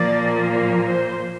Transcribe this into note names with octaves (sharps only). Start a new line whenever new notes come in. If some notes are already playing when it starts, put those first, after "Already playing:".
Already playing: A#2 F3 A#3 D5
C5